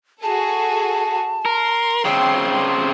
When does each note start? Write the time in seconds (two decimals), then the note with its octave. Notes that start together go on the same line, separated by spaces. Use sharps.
0.23 F#4 G#4 A4 A5
1.45 A#4 C6
2.05 C#3 C4 G5